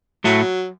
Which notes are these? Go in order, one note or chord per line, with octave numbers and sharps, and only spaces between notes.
A2 F#3 A3